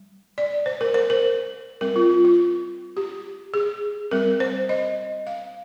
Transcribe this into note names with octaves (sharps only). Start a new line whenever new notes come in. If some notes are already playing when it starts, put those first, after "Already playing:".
Already playing: G3
D5
C5
A#4
C5
A#4
G3 C4 A#4
F4
F4
F4
G4
G#4
G3 C4 A#4
C5
D#5
F5